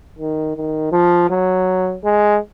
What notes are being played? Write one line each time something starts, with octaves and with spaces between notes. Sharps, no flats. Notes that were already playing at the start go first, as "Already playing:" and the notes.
D#3
D#3
F3
F#3
G#3